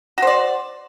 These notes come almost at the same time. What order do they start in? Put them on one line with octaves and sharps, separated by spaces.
F#4 C5 D5